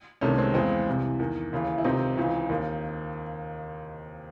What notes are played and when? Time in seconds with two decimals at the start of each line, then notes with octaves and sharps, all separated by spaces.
0.21 C2 C3 D#3 A3 C#4
0.38 G#3 C4
0.54 E2 C#3 E3 G#3 C4
0.87 C2 C3 E3
1.19 E2 D#3
1.53 D#2 C#3 E3
1.78 E4
1.84 C#2 C3 D#3 C4 D#4
2.17 C#2 C#3 E3
2.49 D#2 D#3